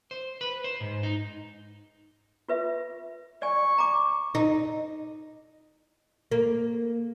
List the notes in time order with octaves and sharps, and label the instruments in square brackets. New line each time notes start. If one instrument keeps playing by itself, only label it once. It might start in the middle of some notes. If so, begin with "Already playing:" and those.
[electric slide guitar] C5
B4
C5
G#2
D#4
[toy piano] F4 B4 E5
[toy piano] D5 G#5 [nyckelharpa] C#6
[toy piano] A#5 D6
[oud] D#4
A#3